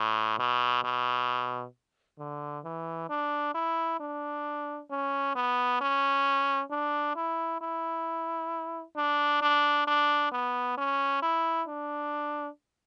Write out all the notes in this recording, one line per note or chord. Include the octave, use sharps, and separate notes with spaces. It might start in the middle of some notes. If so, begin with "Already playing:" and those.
Already playing: A2
B2
B2
D3
E3
D4
E4
D4
C#4
B3
C#4
D4
E4
E4
D4
D4
D4
B3
C#4
E4
D4